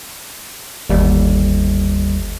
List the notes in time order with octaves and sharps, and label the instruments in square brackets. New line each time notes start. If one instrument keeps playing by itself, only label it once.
[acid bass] G1 [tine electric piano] D#2 G3